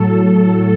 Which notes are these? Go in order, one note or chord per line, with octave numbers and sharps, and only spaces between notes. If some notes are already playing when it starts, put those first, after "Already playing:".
Already playing: A2 F#3 A4